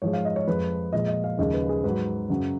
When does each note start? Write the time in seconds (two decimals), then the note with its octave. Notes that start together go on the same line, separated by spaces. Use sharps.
0.02 G#2 F3 G#3 C#5
0.13 F5
0.25 D#5
0.36 C#5
0.47 F2 F3 G#3 B4
0.93 A#2 F3 G#3 D#5
1.08 D#5
1.24 F5
1.38 D#2 C#3 F3 G#3 D#5
1.54 B4
1.69 G#4
1.84 G#2 F#3 B4
2.30 F#2 C#3 F#3